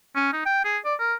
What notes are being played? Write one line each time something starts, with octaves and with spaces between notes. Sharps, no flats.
C#4
D#4
G5
G#4
D5
A#4